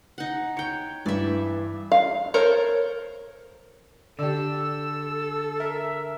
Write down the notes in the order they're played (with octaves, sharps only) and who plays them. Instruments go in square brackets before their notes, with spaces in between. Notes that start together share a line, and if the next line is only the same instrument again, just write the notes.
[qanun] D#4 F#5
[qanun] C#5 G5 [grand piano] C#7
[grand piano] G2 E3 [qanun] D5 E5
[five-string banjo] F5
A4 A#4 C5 C#5
[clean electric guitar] D3 [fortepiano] G4 D5 [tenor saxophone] A4 [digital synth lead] E6
[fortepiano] A#4 [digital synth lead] E5